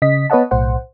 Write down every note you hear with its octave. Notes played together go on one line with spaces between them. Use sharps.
C#3 D#5 B6
B3 B4 C#5 D#5 F#5 A5
B1 A2 C5 F#5